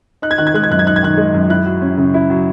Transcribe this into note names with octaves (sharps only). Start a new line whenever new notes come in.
D#4 F#6
G#6
D#3 F#6
G#6
G#3 F#6
G#6
F#2 F#6
G#6
D#4 F#6
G#6
D#3 F#6
G#3
F#2
E4 F#6
F#3
C#4
C#3
E4
F#3